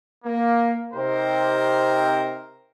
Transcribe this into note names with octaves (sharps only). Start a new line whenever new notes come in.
A#3
C3 C4 D#4 G4 A#4 C5